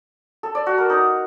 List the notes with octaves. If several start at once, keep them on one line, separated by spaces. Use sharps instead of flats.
A4
D5
F#4
A#4
D#4